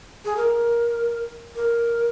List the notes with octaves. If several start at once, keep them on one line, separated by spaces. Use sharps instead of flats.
G#4
A#4
A#4